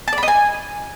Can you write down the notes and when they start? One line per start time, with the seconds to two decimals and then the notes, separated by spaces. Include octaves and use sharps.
0.08 A5
0.13 D5
0.18 B5
0.23 D#5
0.28 G#5